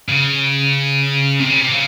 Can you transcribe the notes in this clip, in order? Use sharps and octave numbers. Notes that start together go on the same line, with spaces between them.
C#3
C3
C#3
C3
C#3